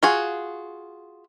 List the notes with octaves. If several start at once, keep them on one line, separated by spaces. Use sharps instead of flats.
F4 F#4 G#4